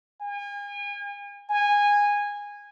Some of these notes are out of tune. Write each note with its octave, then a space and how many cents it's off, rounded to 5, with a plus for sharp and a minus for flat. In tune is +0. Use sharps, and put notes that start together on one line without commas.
G#5 -40
G#5 -15